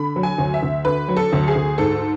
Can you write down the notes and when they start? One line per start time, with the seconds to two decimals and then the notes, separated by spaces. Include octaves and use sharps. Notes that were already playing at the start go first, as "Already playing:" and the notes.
Already playing: D3 B5
0.16 F#3
0.23 G#5
0.38 D2
0.54 E5
0.63 D2
0.85 D3 B4
1.08 F#3
1.17 A4
1.32 D2
1.48 G#4
1.55 D2
1.78 G#2 A4